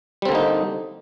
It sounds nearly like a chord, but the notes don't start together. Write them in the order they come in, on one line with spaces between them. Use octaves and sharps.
G3 C4 D3 A#3 D#4